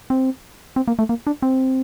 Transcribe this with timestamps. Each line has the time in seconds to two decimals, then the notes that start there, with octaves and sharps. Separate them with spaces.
0.10 C4
0.76 C4
0.88 A#3
0.99 A3
1.09 A#3
1.27 D4
1.42 C4